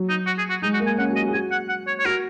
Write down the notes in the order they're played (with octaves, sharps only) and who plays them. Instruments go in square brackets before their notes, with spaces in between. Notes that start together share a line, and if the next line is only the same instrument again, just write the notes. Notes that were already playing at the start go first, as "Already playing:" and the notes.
Already playing: [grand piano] F#3
[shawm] D#4
F#4
G#4
F#4
[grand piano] G#3 [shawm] D#4
[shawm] F#4
[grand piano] A#3
[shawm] G#5
[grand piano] C#4 [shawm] F#5
[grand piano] F#4
[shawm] D#5
[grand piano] F#4
G#4
[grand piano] F#4 [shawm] G#5
[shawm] F#5
F#5
C#5
C#5
[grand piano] F#4 [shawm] A#4